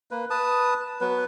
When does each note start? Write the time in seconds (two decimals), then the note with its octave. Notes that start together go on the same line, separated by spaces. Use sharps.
0.11 A#3 B4
0.30 B4 A5 D#6
1.01 F#3 B3 B4